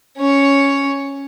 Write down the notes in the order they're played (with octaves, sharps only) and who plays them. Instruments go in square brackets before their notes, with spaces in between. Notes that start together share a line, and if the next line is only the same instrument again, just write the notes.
[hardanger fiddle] C#4 C#5